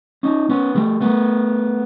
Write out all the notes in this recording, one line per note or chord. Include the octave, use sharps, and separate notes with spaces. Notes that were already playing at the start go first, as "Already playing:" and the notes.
C#4 D#4
B3 C#4
G3 A3
A3 B3